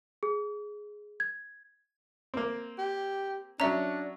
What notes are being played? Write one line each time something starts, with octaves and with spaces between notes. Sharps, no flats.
G#4
G#6
A#3 C4
G4
F#3 C#4 D4 E5 A#5